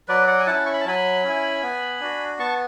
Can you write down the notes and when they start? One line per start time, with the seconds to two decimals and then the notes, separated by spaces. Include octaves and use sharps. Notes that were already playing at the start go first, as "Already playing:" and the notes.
0.08 F#3 B4 D5
0.27 D5 F#5
0.39 G#5
0.46 C#4 E4 F#5 A5
0.66 C#6
0.74 B5
0.80 A5
0.85 F#3 G#5 B5
1.23 C#4 E4
1.62 B3
2.00 D4 F#4
2.39 B3 A5 C#6